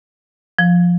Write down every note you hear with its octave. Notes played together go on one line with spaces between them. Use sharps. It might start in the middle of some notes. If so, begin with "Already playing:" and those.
F3